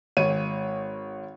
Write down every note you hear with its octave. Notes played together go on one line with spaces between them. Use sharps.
G#1 C#5 D#7